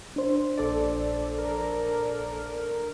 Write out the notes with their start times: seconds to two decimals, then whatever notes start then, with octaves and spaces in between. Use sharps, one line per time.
0.16 D4 C5
0.58 A#1 A4 D5
1.38 A#4